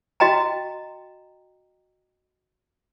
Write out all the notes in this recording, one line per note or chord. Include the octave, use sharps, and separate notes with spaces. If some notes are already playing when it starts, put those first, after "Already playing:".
F#4 D#5 G5 A#5